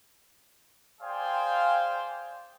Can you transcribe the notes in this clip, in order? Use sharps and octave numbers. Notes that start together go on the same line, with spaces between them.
G#4 C5 D5 F5 G5 G#5